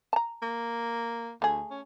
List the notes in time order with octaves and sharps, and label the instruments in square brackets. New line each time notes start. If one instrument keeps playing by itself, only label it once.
[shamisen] A5 A#5
[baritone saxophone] A#3
[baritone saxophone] D2 [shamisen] A3 G#4
[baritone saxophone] C#4